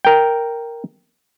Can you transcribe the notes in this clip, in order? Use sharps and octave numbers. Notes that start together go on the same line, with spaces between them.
A#4 G5